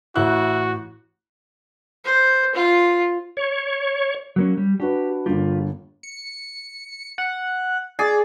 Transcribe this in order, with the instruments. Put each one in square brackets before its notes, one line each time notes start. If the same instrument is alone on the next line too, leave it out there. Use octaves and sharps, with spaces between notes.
[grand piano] A1 F#6 [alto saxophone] E4 [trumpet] F#4
[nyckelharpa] C5
F4
[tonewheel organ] C#5
[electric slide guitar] F#3 A#3 C#4
G3
[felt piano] D4 F#4 B4 [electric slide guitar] G4
[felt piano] G1 G2 A#3 [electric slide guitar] F4 G4
[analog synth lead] C#7
F#5
[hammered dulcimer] G#4 [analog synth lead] D5